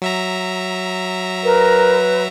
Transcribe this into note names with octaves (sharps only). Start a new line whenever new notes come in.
F#3 E5 A#5
A#4 B4